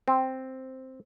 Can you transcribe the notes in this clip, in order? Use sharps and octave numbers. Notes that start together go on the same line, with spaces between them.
C4